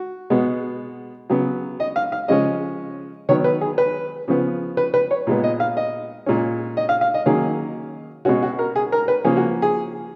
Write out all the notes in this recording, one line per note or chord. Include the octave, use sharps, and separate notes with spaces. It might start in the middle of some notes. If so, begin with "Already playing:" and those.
Already playing: F#4
B2 G#3 B3
C#3 F#3 B3
D#5
F5
F5
C#3 F3 G#3 C#4 D#5
D#3 F#3 B3 C#5
B4
G#4
B4
C#3 F3 B3
B4
B4
C#5
A#2 G#3 B3
D#5
F5
D#5
A#2 G#3 C#4
D#5
F5
F5
D#5
D#3 F#3 A#3 C#4 G#4
B2 G#3 C#4 F#4
F#4
A#4
G#4
A#4
B4
C#3 F3 A#3 C#4 G#4
F#4
G#4